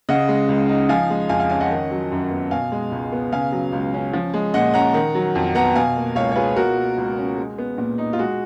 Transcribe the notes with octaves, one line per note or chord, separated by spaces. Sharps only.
C#3 D#5 F#5
G#3
C#2
D#4
F3 F5 G#5
G#3
F2 F5 G#5
F5 G#5
C#4 F5 G#5
D#5 F#5
D#3
F#3
F#2
B3
B2 F5 G#5
G#3
C#2
B3
C#3 F5 G#5
F#3
C#2
C#4
F3
G#3
A#2 D#5 F#5
C#4 F#5 A#5
D#3
F#3
F2
B3 F#5 A#5
B2 F5 G#5
A#3
C#2 C#5 F5
C#5
F4 G#4 B4
B2 F#4 A#4
A#3
C#2
C#4
G#3
B3
A#2
D#4
F4
G#3 F#4